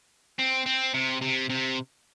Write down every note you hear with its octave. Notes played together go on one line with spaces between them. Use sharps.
C4
C4
C3
C3
C3